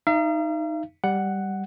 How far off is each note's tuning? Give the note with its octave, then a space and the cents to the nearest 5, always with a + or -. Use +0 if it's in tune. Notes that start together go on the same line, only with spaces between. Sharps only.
D#4 +0 F5 -45
G3 +0 F#5 +5